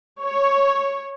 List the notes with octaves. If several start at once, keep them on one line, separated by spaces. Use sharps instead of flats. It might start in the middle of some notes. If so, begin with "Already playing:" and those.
C#5